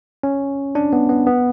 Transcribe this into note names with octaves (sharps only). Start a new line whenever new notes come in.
C#4
D4
B3
B3
B3